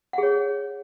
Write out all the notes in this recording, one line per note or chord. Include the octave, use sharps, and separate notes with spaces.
G#4 C#5 F#5